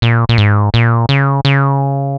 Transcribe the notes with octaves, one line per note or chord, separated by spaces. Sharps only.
A#2
A#2
G#2
A#2
C#3
C#3